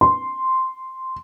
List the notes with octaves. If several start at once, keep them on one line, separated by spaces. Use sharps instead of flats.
C6